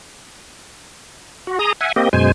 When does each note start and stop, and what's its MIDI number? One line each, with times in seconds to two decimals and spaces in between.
1.47 1.59 66
1.59 1.73 68
1.59 1.73 82
1.59 1.73 87
1.81 1.92 76
1.81 1.92 78
1.81 1.92 80
1.96 2.09 58
1.96 2.09 60
1.96 2.09 67
1.96 2.09 75
2.13 2.32 42
2.13 2.32 47
2.13 2.32 56
2.13 2.32 72
2.13 2.32 80